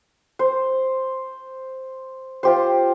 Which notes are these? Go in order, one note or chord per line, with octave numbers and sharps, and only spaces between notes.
C5
F4 G4 C5